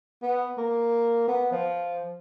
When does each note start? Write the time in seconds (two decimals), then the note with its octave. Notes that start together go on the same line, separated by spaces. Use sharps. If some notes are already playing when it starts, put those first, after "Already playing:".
0.22 B3
0.58 A#3
1.28 B3
1.51 F3